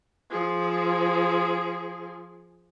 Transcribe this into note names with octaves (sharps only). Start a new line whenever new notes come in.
F3 G#4